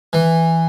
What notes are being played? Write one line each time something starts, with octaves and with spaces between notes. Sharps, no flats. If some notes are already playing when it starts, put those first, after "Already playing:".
E3